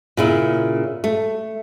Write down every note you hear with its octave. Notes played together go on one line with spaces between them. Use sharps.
A#2 C#3 E4
A3